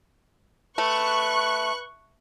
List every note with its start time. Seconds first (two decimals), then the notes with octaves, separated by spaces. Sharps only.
0.78 A3 B4 C#6 F#6